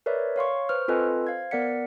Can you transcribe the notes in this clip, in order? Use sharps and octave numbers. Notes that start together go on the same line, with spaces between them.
A#4 B4 C#5 D5 E5
C#5 F5 C6 C#6
B4 C5 C#6 F6
C4 F4 A4 B4 D#5 G#5
C5 F5 G#6
B3 A#4 D5 F#5 B6 C#7